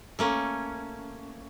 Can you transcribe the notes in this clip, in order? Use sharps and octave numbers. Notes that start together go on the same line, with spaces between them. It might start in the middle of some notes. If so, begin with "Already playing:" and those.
A3 A#3 C#4